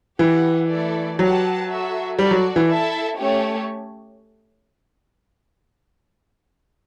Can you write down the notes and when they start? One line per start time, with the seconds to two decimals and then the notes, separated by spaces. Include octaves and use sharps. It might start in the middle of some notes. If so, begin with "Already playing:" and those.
0.19 E3 G4 B4 F#5
0.69 A3 E4 A4 D5
1.19 F#3 G4 B4 F#5 A5
1.68 F#4 A4 E5
2.18 G3 F#4 A4 D5
2.31 F#3
2.56 E3
2.69 E4 A4 E5 A5
3.18 A3 C#4 G4 C#5